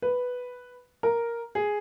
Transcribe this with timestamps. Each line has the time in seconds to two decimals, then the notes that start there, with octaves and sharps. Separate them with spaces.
0.02 B4
1.03 A#4
1.55 G#4